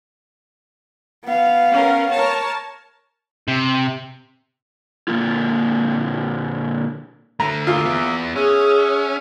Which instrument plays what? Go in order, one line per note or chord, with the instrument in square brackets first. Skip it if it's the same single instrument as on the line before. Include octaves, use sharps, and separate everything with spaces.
[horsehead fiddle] B3 F5
[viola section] C#4 A#4
A#4 C#5 A5
[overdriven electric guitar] C3
[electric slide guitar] A#2 D3 D#3 A#3 F4
[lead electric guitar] D3 A3 [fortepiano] A#5
[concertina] A#3 G#4 E5 [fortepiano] F4
[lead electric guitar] E3 B3
[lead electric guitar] C#4 [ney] G#4 [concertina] E5 F#5 C#6